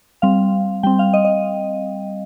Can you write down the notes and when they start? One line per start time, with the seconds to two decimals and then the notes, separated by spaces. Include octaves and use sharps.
0.22 G3 C4 F5
0.83 G3 C4 G5
0.99 F5
1.14 D#5
1.25 D#5